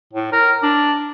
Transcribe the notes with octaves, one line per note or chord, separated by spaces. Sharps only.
A2
A#4
D4